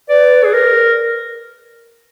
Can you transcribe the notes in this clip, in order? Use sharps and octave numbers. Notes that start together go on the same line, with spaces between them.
B4 D5
G#4
A#4